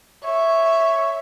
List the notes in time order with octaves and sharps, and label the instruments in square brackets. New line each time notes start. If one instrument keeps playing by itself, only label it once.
[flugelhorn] C#5 [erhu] E5